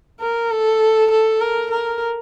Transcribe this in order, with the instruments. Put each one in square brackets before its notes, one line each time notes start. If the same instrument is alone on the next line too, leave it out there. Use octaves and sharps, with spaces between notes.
[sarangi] A#4
A4
A4
A#4
A#4